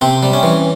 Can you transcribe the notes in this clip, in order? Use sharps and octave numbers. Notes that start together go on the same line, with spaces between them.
C3 C4
G3
C#4
E3